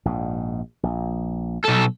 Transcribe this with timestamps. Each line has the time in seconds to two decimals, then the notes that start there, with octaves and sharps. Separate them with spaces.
0.05 A#1 G#2
0.83 A#1
1.64 B1 A4